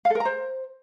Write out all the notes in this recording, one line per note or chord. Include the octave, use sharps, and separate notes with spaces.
F5
A4
A#4
A#5
C5